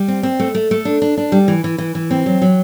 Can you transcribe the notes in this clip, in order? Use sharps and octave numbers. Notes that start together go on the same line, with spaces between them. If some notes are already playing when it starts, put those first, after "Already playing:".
Already playing: G3
C4
C4
A3
A3
A3
D4
D4
D4
G3
E3
E3
E3
E3
C4
F#3
F#3